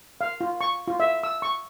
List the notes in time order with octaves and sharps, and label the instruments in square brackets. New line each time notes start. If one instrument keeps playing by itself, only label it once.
[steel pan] F5
F4
C#6
F4
E5
E6
C#6